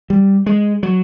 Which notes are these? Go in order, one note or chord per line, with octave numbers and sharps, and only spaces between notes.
G3
G#3
F#3